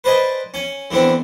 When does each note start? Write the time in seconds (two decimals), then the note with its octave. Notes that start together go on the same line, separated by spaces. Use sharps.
0.04 B4 C5 D5 D#5 G#5 A5
0.54 C#4 G#5
0.91 D3 E3 B3 C4 D4